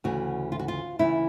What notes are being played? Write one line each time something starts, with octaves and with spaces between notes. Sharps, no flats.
D2 C#3 E3 F#4
F4
F#4
F4
D2 C#3 E3 E4